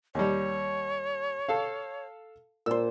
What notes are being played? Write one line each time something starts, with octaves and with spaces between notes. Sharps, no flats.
D#2 G3 C#5
A4 F5
A#2 C5 E6